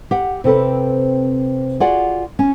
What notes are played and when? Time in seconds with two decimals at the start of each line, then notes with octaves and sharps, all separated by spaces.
0.11 G4 F#5
0.44 C3 C4 A4 B4
1.80 F4 F#4 G#4 D5 F#5
2.39 C#4